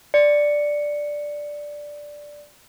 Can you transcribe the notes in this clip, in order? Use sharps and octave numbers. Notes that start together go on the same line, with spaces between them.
D5 C#7